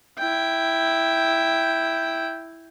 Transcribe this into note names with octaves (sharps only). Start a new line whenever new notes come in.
E4 G5